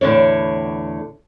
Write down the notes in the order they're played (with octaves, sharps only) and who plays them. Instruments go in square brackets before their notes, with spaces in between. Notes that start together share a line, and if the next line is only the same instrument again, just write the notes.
[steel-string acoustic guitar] E2 A2 D3 D4 C#5